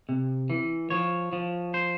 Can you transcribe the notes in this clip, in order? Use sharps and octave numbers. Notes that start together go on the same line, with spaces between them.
C3
E3
F3 C#5
F3
C5